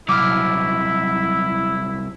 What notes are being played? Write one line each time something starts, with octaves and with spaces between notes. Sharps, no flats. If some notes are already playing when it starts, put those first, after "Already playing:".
C2 F#3 E4 D6 F6